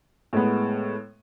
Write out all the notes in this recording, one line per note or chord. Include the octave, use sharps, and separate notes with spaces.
A2 G#3 B3